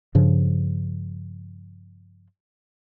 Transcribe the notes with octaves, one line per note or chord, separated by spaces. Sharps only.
G2 C#3 F3